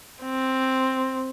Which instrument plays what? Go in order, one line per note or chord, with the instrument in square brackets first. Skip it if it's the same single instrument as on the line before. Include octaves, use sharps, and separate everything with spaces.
[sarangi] C4